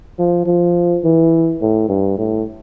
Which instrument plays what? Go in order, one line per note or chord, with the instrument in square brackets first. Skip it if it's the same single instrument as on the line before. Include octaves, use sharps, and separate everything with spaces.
[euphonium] F3
F3
E3
A2
G2
A2